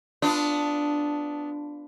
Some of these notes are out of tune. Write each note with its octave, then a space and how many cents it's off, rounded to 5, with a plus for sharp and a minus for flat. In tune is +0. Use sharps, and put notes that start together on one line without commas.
B3 +20 D4 +0 F4 +0